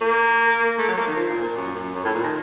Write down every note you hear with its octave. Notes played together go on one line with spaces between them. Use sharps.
A#3
A3
F#3
A#3
D#3
F3
A#2
A#2
F#2
F#2
F#2
A2
A#2
D#3